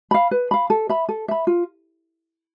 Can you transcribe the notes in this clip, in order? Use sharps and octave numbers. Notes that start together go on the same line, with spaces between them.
F5 B5
B4
F5 B5
A4
E5 B5
A4
E5 B5
F4